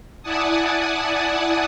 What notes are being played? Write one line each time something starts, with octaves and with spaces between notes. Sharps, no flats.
E4 D5 F#5 G#5 A5 D#6